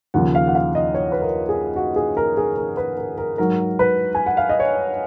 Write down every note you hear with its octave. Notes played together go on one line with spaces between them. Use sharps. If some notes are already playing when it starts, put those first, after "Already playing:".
D#2 C#3 F3 F#5
F5
F#5
F5
D#5
C#5
B4
A#4
G#4
F#4
G#4
A#4
G#4
A#4
B4
A#4
A#4
G#2 F#3 A#4
B4
G#5
F#5
F5
D#5
C#5